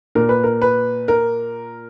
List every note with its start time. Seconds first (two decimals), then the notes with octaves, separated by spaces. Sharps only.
0.15 A#2 A#4
0.29 B4
0.43 A#4
0.62 B4
1.08 A#4